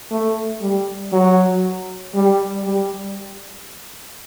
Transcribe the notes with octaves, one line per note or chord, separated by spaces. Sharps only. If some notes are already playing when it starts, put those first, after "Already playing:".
A3
G3
F#3
G3
G3